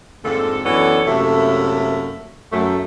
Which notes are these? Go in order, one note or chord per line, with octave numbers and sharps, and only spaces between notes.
F2 G#2 D3 A#3 A4
F#2 E3 B3 D4 A4 C#5
F#2 A2 C3 A3 A#3 E5
F#2 A3